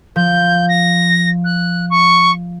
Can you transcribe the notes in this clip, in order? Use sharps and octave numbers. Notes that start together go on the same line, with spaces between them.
F3 G6
A#6
F#6
C#6